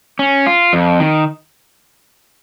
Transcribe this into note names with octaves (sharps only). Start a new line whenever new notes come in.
C#4
F4
F2
D#3